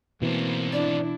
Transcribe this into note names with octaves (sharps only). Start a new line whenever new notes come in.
G#2 B2 E3 A#3 C4
D4 E4 D5